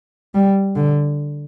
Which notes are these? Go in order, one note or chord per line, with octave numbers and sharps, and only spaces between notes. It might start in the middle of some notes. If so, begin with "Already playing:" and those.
G3
D3